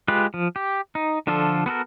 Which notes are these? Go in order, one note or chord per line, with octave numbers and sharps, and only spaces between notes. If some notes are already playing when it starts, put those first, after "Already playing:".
G#3 F4 G4 B4
F3
G4
D#4
D3 F3 D4 F4 A4
B3 F#4 A4 A#4